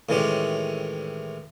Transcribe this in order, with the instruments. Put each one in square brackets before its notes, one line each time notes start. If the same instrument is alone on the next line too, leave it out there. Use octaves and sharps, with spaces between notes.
[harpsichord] A2 D#3 E3 G#3 C#4 G4